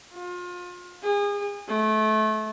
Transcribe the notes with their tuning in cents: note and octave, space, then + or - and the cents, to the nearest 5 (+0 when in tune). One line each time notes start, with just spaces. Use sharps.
F4 +30
G#4 -35
A3 -25